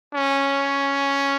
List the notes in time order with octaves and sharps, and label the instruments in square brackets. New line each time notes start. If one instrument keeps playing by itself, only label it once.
[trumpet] C#4